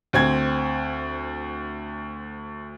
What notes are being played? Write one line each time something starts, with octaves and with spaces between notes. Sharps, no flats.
D2 C4 G#6